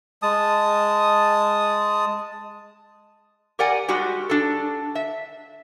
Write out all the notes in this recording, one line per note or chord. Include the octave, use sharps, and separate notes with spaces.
G#3 A5 D#6
G4 A#4 D5 F#5 G#5
G3 G#3 F#4 G4
D4 A4
E5